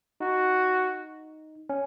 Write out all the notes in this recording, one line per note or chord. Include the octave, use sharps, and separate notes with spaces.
D#4 F#4
C#4